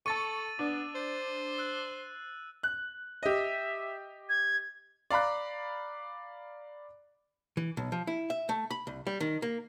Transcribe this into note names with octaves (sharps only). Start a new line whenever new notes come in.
A4 A5 C#6 E6 A6 D#7
B3 D4
C5
E6 F#6
F#6
G4 D#5 E5
G#6
D5 F5 A#5 B5 F#6
E3
B1
F3
E4
E5
A3
B5
C2
G3
D#3
A#3